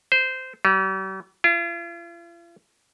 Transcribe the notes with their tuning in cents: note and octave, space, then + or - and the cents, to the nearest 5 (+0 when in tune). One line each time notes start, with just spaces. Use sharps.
C5 -15
G3 -45
F4 -45